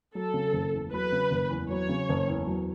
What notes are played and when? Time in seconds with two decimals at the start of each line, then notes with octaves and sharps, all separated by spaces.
0.15 F#3 A4
0.34 C#3
0.53 F#1
0.73 E2
0.92 F#3 B4
1.12 C#3
1.31 F#1
1.50 E2
1.70 F#3 C#5
1.89 C#3
2.09 F#1
2.28 E2
2.47 F#3